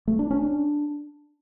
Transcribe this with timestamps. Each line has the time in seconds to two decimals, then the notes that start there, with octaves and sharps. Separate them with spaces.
0.07 A3
0.19 D4
0.31 C#4
0.42 D4